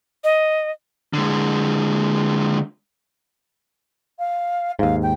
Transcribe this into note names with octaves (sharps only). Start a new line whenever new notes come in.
D#5
D3 G#3
F5
D#2 G#2 F5
G5